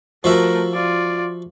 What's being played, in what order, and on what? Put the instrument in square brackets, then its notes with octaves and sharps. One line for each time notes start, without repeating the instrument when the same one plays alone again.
[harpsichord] F3 F#4 E5 [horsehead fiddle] A3 A#4
[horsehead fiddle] F4 D5